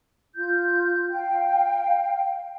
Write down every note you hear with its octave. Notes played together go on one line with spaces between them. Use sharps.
F4 G6
F5 G5